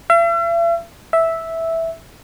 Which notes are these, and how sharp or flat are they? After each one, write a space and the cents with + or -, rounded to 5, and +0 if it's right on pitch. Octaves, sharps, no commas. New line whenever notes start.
E5 +45
E5 -5